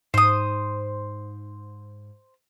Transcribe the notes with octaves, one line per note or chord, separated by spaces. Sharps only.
G#2 C5 D#6